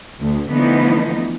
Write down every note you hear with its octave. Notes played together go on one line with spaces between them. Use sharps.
D2
D3 E3 F3 A3 B3 D#4